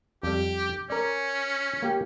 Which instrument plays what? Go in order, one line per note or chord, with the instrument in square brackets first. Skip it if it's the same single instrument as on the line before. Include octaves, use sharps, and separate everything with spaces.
[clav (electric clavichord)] F2 G3 [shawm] G4
[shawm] C#4 [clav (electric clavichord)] A#4 D5
[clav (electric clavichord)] A#3 G4 G5